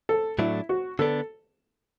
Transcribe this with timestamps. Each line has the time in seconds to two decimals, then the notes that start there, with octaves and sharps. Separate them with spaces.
0.09 A4
0.39 A2 F#3 A3 D4 E4
0.69 F#4
0.99 D3 B3 D4 A4